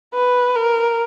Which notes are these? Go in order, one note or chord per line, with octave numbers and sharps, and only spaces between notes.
B4
A#4